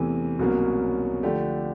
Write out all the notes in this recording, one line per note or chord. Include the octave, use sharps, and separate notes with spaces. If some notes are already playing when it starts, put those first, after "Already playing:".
Already playing: E2 C3 E3 A3
C2 B2 F#3 A#3 C#4
D3 F3 A3 D4 G4